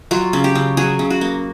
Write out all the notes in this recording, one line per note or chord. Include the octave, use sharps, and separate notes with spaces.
F#3 F4
C#3
G4
C#3
F#3 G#4
C#3
F#4
A#3